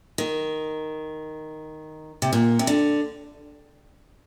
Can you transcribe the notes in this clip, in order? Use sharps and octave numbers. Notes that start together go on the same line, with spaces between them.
D#3
C3
A#2
C3
D3